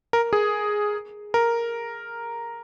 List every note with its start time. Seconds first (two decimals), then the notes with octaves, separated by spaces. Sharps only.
0.13 A#4
0.33 G#4
1.34 A#4